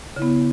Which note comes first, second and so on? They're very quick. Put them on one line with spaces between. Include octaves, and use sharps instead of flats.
C#3 E4 B3